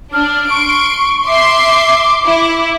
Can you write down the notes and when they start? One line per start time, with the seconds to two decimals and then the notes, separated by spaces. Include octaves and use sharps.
0.13 D4 F6
0.50 C6 C#6 D7
1.26 E5 C6 D6 C7
2.25 E4